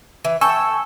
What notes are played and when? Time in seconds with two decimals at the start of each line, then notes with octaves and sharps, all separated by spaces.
0.25 E3
0.41 A4 G5 G#5 C#6 E6